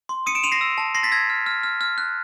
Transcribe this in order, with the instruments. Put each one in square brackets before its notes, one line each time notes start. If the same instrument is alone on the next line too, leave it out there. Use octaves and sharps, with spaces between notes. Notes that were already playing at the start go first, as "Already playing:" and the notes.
[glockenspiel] C6
D#6 C#7 D#7
D7 E7
C6 D#7 F7
A#6 C7
E6
A5
C6 A#6 C7
A6 B6
E6 G#6 A#6
F6
F6
F6
F6
F#6